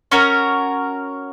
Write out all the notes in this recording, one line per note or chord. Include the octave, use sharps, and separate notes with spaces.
C#4 F#4 A#4 C#5